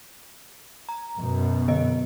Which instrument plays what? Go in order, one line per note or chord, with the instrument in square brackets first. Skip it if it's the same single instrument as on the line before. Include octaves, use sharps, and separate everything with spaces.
[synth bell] A#5
[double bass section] F#2 B2
[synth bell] D3 B3 D#5